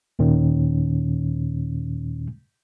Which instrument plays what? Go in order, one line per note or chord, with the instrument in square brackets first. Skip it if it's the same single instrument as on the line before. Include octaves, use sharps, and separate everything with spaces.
[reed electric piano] D#2 A#2 D#3 C#4